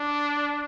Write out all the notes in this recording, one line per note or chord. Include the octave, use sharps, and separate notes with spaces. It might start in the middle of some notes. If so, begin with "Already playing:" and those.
Already playing: D4